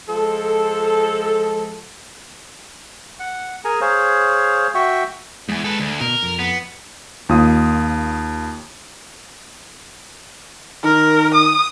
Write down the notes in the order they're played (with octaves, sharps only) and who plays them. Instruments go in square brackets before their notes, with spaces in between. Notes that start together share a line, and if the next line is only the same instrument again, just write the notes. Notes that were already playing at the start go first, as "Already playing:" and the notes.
[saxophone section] F3 G#3 A4
[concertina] F#5
G#4 A#4 G#5 A#5
G#4 C5 C#5 F5
F#4 E5 G5 C#6
[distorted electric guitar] E2 [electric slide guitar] G#3 G#5
[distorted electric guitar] A4 B4
D2
[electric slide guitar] B2 [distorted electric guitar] A#4
[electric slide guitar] F2
[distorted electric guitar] B3
[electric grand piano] D#2 F4 D#6
[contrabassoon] D#3 [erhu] A#4
[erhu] D#6